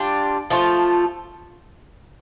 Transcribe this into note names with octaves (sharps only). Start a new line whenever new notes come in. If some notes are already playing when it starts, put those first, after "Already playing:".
Already playing: G3 D4 F4
F3 A3 F4